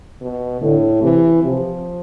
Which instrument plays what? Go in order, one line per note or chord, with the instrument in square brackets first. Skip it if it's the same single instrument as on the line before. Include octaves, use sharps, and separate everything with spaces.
[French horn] B2
[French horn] A2 [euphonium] D3
[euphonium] C3 [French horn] E3
[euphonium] C3 [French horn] F3